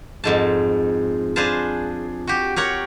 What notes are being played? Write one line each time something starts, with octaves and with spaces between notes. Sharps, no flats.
F2 G#2 A5
D4 G#4 B4 C5 F5 A5
F#4 G4
G4 A#4 C#5 F#5